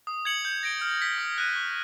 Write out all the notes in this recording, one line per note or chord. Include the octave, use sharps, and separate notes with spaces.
D#6
G#6 C#7 F#7
G6
A#6 D7 G7
F6
G#6 B6
D#6
F#6 A#6 D#7
C#6